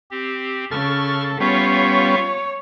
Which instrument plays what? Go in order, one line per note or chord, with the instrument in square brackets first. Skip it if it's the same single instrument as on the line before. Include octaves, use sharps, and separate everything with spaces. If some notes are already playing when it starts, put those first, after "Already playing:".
[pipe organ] C4 G4
[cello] C#3 [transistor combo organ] A4 [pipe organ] C#6 F6 A6
[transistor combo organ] G3 B3 C#4 [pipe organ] F4 E5 F5 [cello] C#5